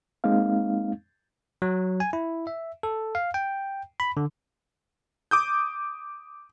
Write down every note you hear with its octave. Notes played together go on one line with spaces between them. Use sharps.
G#3 A#3 C4 D#4 F5
F#3
G#5
E4
E5
A4
F5
G5
B5
D3
D6 D#6 G6